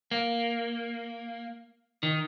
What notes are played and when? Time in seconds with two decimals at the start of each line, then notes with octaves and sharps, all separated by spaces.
0.11 A#3
2.03 D#3